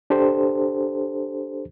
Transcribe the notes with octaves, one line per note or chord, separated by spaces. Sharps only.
D4 G4 A4 C5